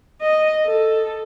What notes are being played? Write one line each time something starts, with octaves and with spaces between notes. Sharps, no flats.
D#5
A4